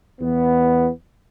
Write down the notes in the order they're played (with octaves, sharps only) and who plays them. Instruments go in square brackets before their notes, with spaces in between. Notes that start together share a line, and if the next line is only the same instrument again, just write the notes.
[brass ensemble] E2 B3